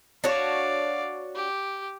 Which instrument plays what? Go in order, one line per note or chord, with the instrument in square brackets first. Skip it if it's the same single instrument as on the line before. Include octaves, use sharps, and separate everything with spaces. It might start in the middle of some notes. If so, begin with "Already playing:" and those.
[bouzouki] D4 F#4 C#5 [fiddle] D5 F5
[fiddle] G4